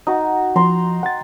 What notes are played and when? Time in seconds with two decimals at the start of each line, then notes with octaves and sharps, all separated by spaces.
0.07 D#4 F#4 D#6
0.56 F3 A#5 C6
1.03 F#5 G5 A6